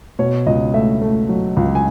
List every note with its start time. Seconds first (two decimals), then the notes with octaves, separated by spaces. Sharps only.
0.19 B2 C#5
0.46 C#2 D#5
0.74 A3 E5
1.02 A3
1.29 F#3
1.57 C#2
1.75 G#5